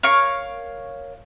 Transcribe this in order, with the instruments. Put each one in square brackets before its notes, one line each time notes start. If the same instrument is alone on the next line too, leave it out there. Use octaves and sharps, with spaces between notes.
[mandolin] A#4 C#5 F5 C#6